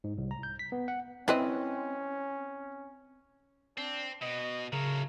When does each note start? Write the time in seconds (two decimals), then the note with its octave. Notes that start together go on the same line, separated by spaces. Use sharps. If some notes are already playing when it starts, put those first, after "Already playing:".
0.04 G#2
0.18 C2
0.31 A#5
0.43 G6
0.59 B6
0.72 B3
0.88 F#5
1.28 C4 C#4 E4 B4 D#5
3.77 C4 D4
4.21 B2 D#5
4.73 A2 C#3 F#3 A#4